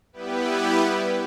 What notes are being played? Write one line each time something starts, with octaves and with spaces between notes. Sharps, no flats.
G3 B3 E4 G4 B4